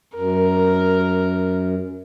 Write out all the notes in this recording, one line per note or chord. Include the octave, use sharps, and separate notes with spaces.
F#2 A#4